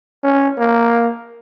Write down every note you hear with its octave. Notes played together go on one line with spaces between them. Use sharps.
C#4
A#3